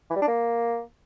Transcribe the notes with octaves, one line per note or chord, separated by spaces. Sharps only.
E3
G3
D4
A#3